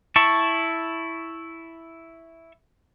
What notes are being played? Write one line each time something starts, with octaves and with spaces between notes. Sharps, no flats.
E4 A5 C#6